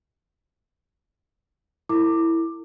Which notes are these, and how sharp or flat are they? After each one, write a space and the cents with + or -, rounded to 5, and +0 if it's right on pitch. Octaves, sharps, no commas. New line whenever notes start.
E4 +0 A#4 -45 D6 +10